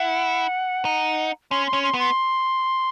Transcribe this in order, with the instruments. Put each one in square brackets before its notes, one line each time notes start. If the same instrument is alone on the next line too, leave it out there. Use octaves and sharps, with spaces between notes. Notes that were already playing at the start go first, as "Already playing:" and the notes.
Already playing: [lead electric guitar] E4 [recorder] F#5
[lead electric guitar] D#4
[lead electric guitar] C#4 [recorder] C6
[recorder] C6
[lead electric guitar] C#4
[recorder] C6
[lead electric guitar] B3
[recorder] C6